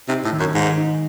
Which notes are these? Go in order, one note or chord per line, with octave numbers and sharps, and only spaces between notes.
C3 D#4
A2
D#3
F#2
G#2 D#3
D#4